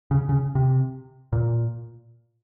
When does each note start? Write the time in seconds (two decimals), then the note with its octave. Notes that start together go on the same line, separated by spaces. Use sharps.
0.11 C#3
0.29 C#3
0.55 C3
1.33 A#2